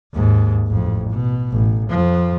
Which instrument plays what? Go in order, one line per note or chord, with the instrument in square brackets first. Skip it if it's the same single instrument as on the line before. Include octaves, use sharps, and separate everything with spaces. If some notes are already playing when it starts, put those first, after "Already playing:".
[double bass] D#2 G#2
A1 F2
B2
A1
F2 F3